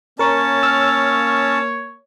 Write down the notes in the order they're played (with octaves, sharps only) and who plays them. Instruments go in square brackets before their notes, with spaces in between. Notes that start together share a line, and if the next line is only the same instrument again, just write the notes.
[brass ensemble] A#3 C#5 [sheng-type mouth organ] C#4 A5 [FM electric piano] A#4 C#6
[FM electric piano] E6 F6